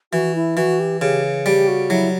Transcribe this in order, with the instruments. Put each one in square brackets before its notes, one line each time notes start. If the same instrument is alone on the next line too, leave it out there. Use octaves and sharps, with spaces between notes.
[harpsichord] E3 [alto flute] F#4
[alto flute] E4
[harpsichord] E3 [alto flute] F#4
[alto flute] G4
[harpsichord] C#3 [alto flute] G4
[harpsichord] G3 [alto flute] G4
[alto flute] F#4
[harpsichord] F#3 [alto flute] E4